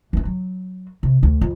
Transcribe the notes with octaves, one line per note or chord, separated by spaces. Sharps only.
E3 C#4
F#3
C3
D2
F2